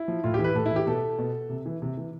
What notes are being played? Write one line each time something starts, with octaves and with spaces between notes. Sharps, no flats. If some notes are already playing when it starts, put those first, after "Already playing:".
Already playing: E4
F3
A2 F4
G4
E3
B4
A2 A4
E4
E3
G4
B2 A4
B2
C3
E3
C3
E3